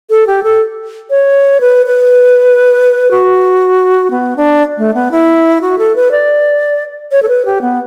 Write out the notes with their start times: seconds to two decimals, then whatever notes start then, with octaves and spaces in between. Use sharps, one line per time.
0.10 A4
0.27 G4
0.43 A4
1.10 C#5
1.61 B4
1.86 B4
3.11 F#4
4.11 B3
4.37 D4
4.78 A3
4.94 B3
5.11 E4
5.61 F#4
5.78 A4
5.96 B4
6.11 D5
7.12 C#5
7.22 A4
7.28 B4
7.46 G4
7.61 B3